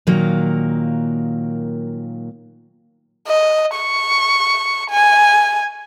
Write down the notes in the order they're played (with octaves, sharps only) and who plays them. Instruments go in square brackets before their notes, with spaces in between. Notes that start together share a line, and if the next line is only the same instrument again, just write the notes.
[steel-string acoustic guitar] A#2 D#3 F#3 A#3
[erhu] D#5
C#6
G#5